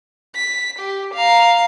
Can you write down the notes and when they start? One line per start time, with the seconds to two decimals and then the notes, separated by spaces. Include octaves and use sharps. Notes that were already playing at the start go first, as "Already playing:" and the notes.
0.35 B6
0.79 G4
1.14 F5 A#5